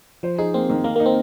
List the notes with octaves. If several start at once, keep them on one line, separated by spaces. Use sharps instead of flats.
F3 C5
D#4 G#4
A#3 C4
D#3
A#3 A#4
A#3 D#4
C4